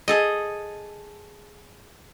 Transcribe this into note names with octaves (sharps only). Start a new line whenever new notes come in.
G#4 A4 D#5